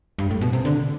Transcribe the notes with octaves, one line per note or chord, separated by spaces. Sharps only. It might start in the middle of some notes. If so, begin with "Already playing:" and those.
G2
A2
B2
C3
D3